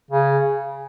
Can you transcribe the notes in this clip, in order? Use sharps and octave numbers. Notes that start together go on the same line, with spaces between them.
C#3